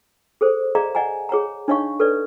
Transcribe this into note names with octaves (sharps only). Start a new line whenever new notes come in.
G#4 A4 C5
G#4 D5 D#5 F5 A#5
D5 D#5 F#5 G#5 A#5
G#4 C#5 F#5 A#5
D4 D#4 C#5 D#5 F5 C#6
A4 B4 C#5 D5